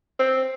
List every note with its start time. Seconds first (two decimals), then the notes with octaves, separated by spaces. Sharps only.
0.19 C4